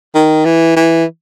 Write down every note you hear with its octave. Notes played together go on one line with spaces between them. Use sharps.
D#3
E3
E3